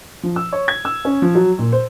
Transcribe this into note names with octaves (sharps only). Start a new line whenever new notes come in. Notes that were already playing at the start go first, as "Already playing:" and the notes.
F3
E6
C#5
G#6
E6
C#4
F3
F#3
A#2
C5